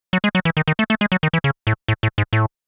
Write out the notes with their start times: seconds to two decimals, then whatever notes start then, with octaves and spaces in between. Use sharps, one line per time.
0.13 F#3
0.24 G#3
0.35 F#3
0.45 E3
0.57 D#3
0.68 D#3
0.79 A3
0.90 A3
1.01 G#3
1.12 F#3
1.23 D#3
1.33 E3
1.44 C#3
1.67 A2
1.88 A2
2.03 A2
2.18 G#2
2.33 A2